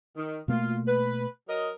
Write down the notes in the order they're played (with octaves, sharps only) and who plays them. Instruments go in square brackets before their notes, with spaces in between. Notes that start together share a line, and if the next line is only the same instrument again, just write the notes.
[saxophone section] D#3
[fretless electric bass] B2 A3 A#3 [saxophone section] F4
[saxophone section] B4
F#3 A#4 D#5